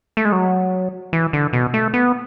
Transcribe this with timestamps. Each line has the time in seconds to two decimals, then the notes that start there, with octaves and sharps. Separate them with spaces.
0.17 A3
0.25 G#3
0.32 F#3
1.13 E3
1.33 D3
1.53 B2
1.74 A3
1.94 B3